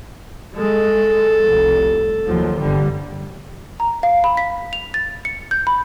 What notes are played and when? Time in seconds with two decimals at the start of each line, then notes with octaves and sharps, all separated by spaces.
0.57 G#3 A4
1.44 F1 C2
2.26 D#2 F3 F#3
2.59 G1 D3 G3
3.80 A#5
4.03 F5
4.24 B5
4.37 B6
4.73 F7
4.94 A6
5.25 C#7
5.51 G6
5.67 B5